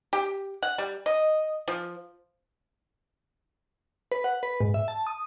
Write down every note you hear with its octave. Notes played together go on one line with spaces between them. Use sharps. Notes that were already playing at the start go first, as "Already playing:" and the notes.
G4
F#5
G3
D#5
F3
B4
F#5
B4
G#2
E5
A5
D#6